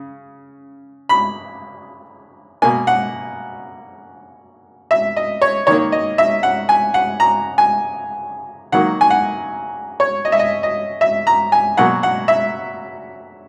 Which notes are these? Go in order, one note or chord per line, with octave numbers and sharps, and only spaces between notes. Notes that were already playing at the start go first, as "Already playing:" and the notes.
Already playing: C#3
B5
B2 A#3 G#5
F#5
E5
D#5
C#5
D#3 A#3 C#5
D#5
E5
F#5
G#5
F#5
A#5
G#5
D#3 F#3 A#3 F#5
G#5
F#5
C#5
D#5
E5
D#5
D#5
E5
A#5
G#5
B2 F#3 A#3 F#5
F#5
E5